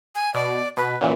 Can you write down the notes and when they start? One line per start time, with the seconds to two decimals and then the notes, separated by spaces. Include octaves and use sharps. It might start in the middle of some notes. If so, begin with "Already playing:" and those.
0.15 G#5
0.34 B2 D5
0.77 B2 B4
1.01 F#2 A#2 E3